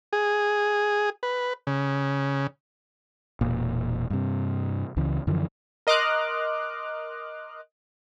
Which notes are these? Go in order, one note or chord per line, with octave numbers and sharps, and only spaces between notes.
G#4
B4
C#3
E1 A#2
G2 C3
C#2 C#3 E3
F#2 D3 E3 F3
A#4 D#5 C6 D6 F6 F#6